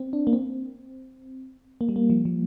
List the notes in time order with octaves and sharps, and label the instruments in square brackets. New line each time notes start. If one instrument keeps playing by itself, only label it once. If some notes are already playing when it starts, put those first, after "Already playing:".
Already playing: [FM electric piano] C4
D4
A#3
C4
A#3
G3
A#3
F3
F3